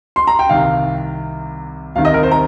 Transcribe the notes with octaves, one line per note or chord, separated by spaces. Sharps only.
C6
A#5
G5
C2 C3 D#3 F5
C2 C3 D#3 F5
D#5
A#4
C5
A#5